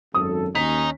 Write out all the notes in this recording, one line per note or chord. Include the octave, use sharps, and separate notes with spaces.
G#1 F#2 A4 D#6
D#2 C#4 D#4 B6